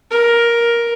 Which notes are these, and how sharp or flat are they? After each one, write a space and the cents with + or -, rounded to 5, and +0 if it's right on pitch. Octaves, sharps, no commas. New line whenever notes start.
A#4 +10